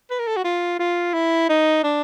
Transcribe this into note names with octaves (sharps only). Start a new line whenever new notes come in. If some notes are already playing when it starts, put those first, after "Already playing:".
B4
A#4
A4
F#4
F4
F4
E4
D#4
D4